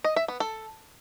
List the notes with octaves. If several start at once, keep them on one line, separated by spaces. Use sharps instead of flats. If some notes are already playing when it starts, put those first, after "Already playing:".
D#5
E5
B3
A4